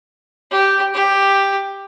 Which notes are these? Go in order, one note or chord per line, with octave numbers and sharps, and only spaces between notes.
G4
G4